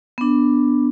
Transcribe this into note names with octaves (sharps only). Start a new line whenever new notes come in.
B3 D4